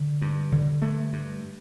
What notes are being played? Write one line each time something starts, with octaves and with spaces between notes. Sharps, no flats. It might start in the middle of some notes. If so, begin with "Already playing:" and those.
Already playing: D3
G2
D3
G2 A3
G2